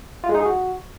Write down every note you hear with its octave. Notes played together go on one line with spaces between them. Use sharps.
F4
G#3
D#4
G#4
F#4